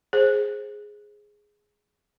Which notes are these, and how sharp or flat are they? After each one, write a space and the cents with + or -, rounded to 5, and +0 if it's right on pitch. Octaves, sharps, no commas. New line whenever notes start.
G#4 +0 C5 +15